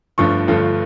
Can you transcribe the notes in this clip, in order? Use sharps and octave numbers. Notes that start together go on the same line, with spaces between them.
G1 G2 D3 F3 A3 C#6
G1 G2 D3 F3 A3